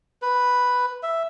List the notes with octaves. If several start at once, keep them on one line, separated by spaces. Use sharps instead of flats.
B4
E5